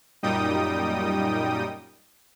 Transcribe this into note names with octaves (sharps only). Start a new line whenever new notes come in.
F#2 A#2 G3 D#4 G5 D#6